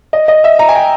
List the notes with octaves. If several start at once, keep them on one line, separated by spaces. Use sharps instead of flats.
D#5
D#5
E5
A#5
G#5
G5